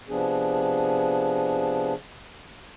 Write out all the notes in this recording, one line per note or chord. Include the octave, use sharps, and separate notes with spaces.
C3 F3 B3 D4 G#4